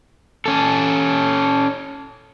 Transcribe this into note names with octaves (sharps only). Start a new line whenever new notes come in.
C#4 A4